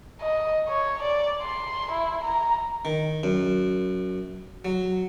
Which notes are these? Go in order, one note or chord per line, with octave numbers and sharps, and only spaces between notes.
D#5
C#5
D5
C6
E4
A#5
D#3
F#2
F#3